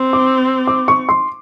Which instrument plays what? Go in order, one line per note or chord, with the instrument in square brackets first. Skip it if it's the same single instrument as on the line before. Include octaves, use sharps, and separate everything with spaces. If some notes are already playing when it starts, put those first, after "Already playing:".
Already playing: [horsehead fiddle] C4
[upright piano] D6
D6
C#6
C6